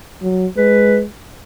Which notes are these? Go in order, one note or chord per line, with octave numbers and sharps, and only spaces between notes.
F#3
G#3 B4